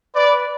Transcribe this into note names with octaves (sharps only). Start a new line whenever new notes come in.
B4 D5